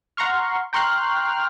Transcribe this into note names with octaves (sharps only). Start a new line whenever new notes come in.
F#5 A#5 C6 C#6 F6
G5 A#5 C6 C#6 F6 F#6